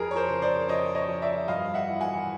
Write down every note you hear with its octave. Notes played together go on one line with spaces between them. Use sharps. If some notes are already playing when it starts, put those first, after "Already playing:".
Already playing: F2 G#4 A#4
C#5
A#4 C5
C#3
C5 D5
F2 C#5 D#5
C#5 D#5
F3
D5 E5
G2 D#5 F5
E5 F#5
E3
F#5 G#5